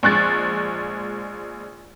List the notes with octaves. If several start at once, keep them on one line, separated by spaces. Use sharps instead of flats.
A#1 G#3 F#6 A6